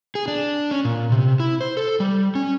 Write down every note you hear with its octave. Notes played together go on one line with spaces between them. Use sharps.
G#4
D4
C#4
A#2
C3
E4
C5
A4
G3
C#4